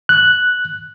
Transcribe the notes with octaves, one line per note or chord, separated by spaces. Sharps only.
F#6